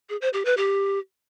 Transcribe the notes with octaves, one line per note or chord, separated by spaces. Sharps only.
G#4
C5
G4
B4
G4